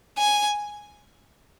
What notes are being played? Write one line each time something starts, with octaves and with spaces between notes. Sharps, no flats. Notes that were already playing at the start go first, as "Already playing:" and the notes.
G#5